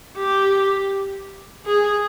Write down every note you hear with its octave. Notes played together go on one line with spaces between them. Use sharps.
G4
G#4